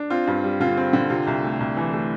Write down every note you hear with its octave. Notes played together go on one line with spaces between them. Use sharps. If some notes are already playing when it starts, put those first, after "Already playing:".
Already playing: D4
C4 F4
G2
G3
D3 F4
C4
D3
C3 F4
C2
A3
C2
E3
A3